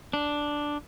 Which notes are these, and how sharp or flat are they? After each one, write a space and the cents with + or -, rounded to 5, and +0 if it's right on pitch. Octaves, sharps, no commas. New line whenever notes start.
D4 +0